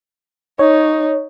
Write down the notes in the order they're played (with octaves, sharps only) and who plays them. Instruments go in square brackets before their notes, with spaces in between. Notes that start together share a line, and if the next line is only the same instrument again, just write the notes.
[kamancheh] D#4 [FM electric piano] C#5